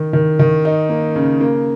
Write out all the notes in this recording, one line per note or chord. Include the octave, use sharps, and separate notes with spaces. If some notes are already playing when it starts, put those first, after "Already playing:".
Already playing: D#3
D#3
D#3
D#4
A#3
C#3
A#3